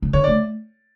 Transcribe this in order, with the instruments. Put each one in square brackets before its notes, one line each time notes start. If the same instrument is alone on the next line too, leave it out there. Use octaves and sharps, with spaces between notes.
[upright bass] C#3
[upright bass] D3 [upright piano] C#5
[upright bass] A3 [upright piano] D5